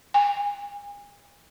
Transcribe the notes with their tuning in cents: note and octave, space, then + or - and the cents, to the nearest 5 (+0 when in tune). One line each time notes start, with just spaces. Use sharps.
G#5 -35